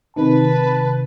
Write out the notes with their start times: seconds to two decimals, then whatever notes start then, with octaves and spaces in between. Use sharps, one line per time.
0.16 C3 D#3 B4 A5